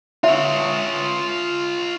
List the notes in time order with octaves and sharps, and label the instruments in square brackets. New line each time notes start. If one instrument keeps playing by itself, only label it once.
[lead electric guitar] F4 C#5 [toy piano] E5